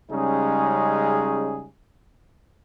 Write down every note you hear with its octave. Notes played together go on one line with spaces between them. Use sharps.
C#3 G3 G#3 C#4 D#4 G#4